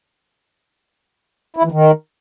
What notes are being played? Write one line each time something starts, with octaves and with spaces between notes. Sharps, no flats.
E4
E3
D#3